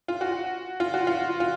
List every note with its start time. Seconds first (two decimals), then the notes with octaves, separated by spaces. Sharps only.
0.08 F4
0.21 F#4
0.80 F4
0.94 F#4
1.07 F4
1.40 F4